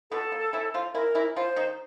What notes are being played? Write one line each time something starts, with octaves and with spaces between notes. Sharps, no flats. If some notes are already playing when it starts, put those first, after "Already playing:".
B2 B3 A4
A#3
E3 E4
F3 F4
E3 E4 A#4
E3 E4
F3 F4 C5
D#3 D#4